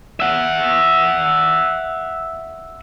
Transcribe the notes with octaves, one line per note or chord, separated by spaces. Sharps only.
E5 F#5